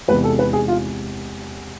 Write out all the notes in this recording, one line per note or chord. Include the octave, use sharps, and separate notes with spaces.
E2 C3 G#3 B4
A4
B4
G#4
F4